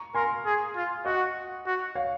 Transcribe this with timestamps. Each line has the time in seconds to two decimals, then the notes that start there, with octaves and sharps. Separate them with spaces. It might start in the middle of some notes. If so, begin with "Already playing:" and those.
Already playing: A#5 C#6
0.15 A#4 G#5 C6
0.46 G#4
0.76 F4
1.05 F#4 D#5 F#5
1.66 F#4
1.95 C#5 F5